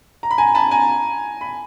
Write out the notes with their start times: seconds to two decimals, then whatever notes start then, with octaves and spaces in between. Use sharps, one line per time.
0.23 A#5
0.31 B5
0.38 G#5 A#5
0.55 A5 B5
0.71 G#5 A#5
1.41 B5